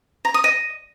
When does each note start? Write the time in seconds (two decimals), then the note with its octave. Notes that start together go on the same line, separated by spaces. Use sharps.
0.25 A#5
0.34 D#6
0.44 D#5